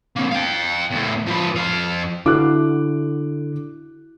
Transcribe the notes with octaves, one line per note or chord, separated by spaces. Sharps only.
A#3 C4
F5 G5
E2 A2
F3 B4
F2 F5
D3 E4 F#4 F5 D6 F#6